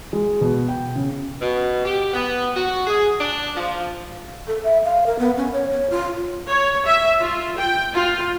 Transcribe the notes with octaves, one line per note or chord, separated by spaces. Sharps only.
G#3
B2
G5
C#3
B2
G4
B3
F#4
G#4
D4
F3
A4
E5
F5
A#4
B3
C#4
C#5
C#5
F4
C#5
E5
F4
G5
F4